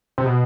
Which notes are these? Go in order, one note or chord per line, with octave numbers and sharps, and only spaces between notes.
C3
B2